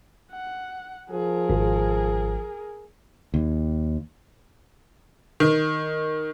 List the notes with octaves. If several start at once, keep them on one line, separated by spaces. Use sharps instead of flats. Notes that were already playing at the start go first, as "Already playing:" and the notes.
F#5
F3 G#4 A#4
G#1
D#2
D#3